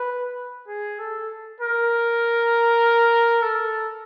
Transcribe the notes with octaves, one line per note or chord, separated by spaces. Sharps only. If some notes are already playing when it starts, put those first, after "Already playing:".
Already playing: B4
G#4
A4
A#4
A4